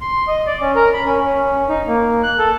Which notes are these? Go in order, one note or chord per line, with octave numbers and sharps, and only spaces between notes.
C6
D#5
D5
C#4
A#4
B5
C#4
C#4
D#4
A#3
F#6
A4